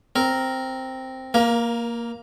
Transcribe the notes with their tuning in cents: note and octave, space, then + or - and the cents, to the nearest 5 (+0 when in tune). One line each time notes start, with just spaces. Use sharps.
C4 +0 A#4 +0
A#3 +0 A#4 +25